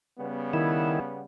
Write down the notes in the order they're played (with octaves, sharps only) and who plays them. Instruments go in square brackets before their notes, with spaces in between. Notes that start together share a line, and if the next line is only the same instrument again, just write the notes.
[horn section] C#3 G3 B3
[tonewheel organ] D#3 E4